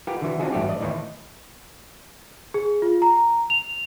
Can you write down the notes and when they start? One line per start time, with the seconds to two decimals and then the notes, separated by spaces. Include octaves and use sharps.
0.07 F4 G4 A#4 B4 F#5 G5
0.22 D3 E3 F#4
0.39 C4 D4 D#4 F4 F#4 G#4
0.52 A1 G2 A3 F#4 G4
0.69 D5 D#5
0.80 D#2 A2 D#3 E3 D#4
2.54 G#4
2.82 F4
3.02 A#5
3.50 F7